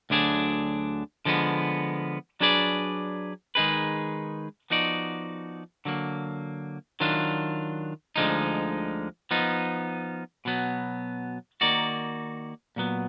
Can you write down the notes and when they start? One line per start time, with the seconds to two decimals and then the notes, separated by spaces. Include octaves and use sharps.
0.10 D2 D3 F#3 D4 G#4
1.25 D3 F3 G#3 B3
2.40 F#3 D4 G#4 B4 D5
3.55 D#3 G#3 D#4 G#4 B4
4.70 F3 B3 D#4 F#4 D5
5.85 D3 F#3 A#3
7.00 D#3 F#3 D4 F4
8.16 D2 D3 F3 G#3 D#4
9.31 F3 B3 D#4
10.45 B2 F#3 B3
11.61 D#3 A#3 D#4 F#4 D5
12.76 A#2 F#3 B3